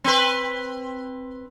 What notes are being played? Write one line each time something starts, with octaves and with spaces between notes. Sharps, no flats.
C4 B4